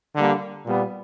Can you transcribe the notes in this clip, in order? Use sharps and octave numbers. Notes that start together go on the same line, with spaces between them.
D3 G3 A#3
A#2 G3 B3